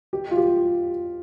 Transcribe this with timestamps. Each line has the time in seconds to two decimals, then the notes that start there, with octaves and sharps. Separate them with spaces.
0.13 G4
0.31 F4
0.37 G4